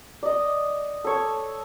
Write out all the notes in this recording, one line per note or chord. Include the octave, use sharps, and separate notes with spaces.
D5 D#5
A4 C#5